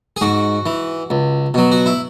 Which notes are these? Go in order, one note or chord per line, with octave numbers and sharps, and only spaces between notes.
G#4
G#2 F#4
E3
C#2
B2 F#3
F#4
E4